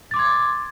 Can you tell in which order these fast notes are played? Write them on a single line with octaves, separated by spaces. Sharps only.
A6 D6 C6 G#6